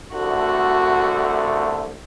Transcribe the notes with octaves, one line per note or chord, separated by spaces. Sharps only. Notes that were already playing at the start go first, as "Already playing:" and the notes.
C2 D3 A3 F#4